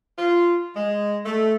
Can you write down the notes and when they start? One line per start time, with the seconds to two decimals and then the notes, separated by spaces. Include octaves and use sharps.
0.18 F4
0.75 G#3
1.26 A3